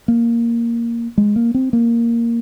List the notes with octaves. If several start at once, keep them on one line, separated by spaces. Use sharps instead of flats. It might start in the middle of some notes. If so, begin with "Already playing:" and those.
A#3
G#3
A#3
C4
A#3